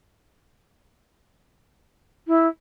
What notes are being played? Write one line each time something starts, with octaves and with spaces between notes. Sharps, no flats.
E4